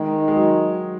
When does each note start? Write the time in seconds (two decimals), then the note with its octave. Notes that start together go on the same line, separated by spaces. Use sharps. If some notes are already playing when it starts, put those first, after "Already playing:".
Already playing: D#3 G#3
0.28 G#3
0.35 F#3